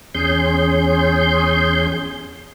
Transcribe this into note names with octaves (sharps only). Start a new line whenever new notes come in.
E2 C#4 G#4 C6 G6